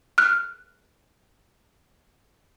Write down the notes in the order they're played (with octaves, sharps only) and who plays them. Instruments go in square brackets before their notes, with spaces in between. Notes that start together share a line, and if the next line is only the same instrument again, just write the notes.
[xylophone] F6 F#6